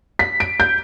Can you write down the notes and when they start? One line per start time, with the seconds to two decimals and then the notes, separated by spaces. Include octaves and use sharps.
0.19 B6
0.40 D7
0.60 G6